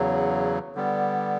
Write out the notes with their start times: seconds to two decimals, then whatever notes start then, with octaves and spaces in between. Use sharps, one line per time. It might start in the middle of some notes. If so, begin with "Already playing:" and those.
Already playing: E2 C#3 F#3
0.75 D3 G3 B3